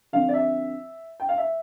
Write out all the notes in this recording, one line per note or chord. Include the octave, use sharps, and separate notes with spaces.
D3 F3 C4 F5
D5
E5
G5
F5
E5